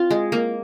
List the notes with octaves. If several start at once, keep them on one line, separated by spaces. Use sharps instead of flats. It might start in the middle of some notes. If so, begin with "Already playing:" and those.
Already playing: C4 F4
G#3
A#3